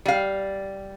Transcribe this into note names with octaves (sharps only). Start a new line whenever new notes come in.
G3 F5